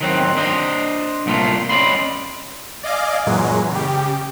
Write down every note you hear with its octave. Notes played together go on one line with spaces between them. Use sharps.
D#3 F#3 C4
D4 C5 D#5
C2 A#2 A3 F4
C#4 D5 D#5 B5 C6
D5 D#5 F5 G#5 D6
F#2 A#2 E3 F#3 G#3
C#3 G4